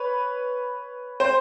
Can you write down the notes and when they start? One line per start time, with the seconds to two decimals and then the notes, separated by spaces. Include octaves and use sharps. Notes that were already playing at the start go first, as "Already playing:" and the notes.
Already playing: B4 C#5
1.20 C5